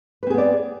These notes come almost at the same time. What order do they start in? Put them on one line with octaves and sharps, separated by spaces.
B4 C4 G#4 B3 D5